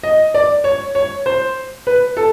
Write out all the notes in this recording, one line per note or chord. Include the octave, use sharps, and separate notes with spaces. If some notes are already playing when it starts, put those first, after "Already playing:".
D#5
D5
C#5
C#5
C5
B4
A4